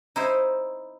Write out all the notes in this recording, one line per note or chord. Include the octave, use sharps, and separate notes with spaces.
D#4 E4 C5